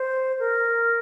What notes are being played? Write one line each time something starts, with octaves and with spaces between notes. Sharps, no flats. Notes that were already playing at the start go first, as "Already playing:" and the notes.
Already playing: C5
A#4